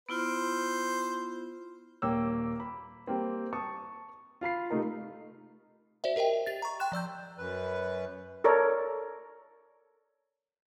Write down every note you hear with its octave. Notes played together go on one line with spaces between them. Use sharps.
B3 E4 F4 C5
D#1 A#3 C#5 G5 D6 E6
B5
G3 A#3 C4
A5 C#6 D#6
F4 F5 B5 C7
C3 A3 D#4 A#4
F#4 C5 D5 E5
G4 A#4 D#5 E5 G5
G4 A6
A#5 C#6
G5 C6 F#6 E7
F3 D5 E6 G6
F#2 B4
A4 A#4 C#5 D5